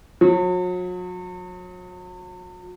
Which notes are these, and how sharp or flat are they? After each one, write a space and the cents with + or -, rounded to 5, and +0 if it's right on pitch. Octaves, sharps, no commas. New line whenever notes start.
F#3 -40